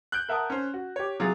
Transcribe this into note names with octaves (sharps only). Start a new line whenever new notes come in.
F#6 G6 D7
A#4 E5 F#5 A5 D#6
C#4 C5
F#4
G4 C#5
C3 F#3 F4 G#4 A6